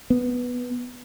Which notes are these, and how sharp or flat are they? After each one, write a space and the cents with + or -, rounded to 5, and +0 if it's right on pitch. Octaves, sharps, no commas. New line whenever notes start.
B3 -5